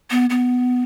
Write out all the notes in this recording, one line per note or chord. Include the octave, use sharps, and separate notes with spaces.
B3
B3